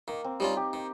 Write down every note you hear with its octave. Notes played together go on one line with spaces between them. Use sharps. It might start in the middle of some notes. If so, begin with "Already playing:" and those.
D#3 A#3
C4
G3 C#4 D#4 F4
G4
D#3